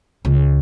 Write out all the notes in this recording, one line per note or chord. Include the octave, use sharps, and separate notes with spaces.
C#2